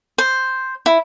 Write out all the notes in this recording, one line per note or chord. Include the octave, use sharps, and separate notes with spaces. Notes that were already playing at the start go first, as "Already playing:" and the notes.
C5
E4